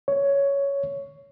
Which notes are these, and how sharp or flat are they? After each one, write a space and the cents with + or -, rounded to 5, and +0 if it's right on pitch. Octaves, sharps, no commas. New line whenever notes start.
C#5 +10